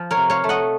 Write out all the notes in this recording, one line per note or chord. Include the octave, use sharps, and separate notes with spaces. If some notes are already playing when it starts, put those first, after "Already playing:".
Already playing: F3
A#4 C#5
C3
C#5 F5
A3
D#5 F#5